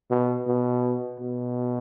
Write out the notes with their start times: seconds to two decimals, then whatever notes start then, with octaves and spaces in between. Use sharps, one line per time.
0.10 B2
0.47 B2
1.20 B2